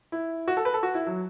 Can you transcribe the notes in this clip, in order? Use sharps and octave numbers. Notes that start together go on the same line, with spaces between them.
E4
F#4
A4
B4
A4
F#4
E4
F#3